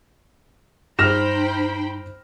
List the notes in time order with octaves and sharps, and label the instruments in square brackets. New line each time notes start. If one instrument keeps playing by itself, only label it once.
[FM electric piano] G2 [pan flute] D#4 [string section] C5 G5 B5 [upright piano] F6 A#6 E7